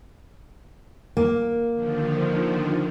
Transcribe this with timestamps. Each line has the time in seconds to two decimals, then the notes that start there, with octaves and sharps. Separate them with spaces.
1.17 A#3
1.74 D3 D#3 F3